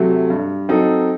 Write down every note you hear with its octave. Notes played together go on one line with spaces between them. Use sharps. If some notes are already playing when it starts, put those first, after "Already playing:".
Already playing: C3 F#3 A3
G2
F#3 C4 D#4 A4